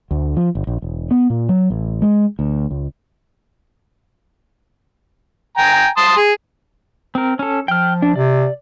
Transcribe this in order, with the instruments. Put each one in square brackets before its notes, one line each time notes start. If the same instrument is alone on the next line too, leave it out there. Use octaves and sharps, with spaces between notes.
[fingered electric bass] D2
F3
G1
A#1
E1
B3
A#2
F#3
A1
G#3
D2
C#2
[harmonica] G5 G#5 A#5
A5 C6 D#6
G#4
[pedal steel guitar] C4 A#4
C#4 A4
[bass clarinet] F3 [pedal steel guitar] G5 F6
[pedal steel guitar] D4
[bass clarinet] C3 [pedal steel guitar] D5